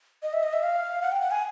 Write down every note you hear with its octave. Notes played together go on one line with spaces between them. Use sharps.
D#5
E5
D#5
E5
F5
F#5
G5
F#5
G#5